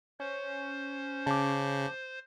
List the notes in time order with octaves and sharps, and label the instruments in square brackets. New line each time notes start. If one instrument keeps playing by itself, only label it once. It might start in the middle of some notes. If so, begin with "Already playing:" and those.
[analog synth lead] C#4 [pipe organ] C5
[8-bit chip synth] C#3 [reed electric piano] A5 D6